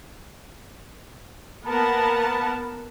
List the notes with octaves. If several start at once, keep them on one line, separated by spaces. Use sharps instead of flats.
A#3 B3 A#4 B4 F#5 A5